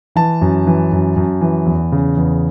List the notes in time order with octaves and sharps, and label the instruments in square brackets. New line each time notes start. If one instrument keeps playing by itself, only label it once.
[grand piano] E3 A5
F#2
E3
F#2
F#2
E3
E2
C#3
E2